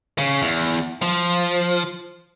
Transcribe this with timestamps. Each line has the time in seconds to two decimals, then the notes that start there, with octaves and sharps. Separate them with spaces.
0.18 C#3
0.42 E2
1.02 F3